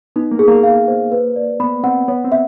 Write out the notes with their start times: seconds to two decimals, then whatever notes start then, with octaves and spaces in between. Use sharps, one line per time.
0.16 B3 D#4
0.31 A#3
0.39 G#4
0.48 A#3
0.63 F5
0.88 C5
1.12 B4
1.36 D5
1.60 B3 B5
1.84 C4 F#5
2.08 B3 C#5
2.25 C4
2.32 E5